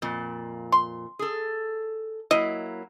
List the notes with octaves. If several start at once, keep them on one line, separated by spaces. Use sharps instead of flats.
F2 A#2
C6
G#4 A4
F#3 A#3 E4 D#5